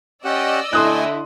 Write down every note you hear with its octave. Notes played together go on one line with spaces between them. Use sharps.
C#4 G4 D5 D#5 F#5 E6
D3 A3 E4 G#5 C6 D#6 F#6